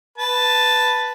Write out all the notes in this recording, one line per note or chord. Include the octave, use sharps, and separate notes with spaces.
B4 A5